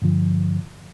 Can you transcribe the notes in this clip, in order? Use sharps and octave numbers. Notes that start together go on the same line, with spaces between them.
G2 D3 F3